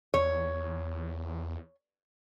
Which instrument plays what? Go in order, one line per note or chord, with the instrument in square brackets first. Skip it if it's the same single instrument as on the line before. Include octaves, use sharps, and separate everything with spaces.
[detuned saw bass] E2 [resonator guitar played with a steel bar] C#5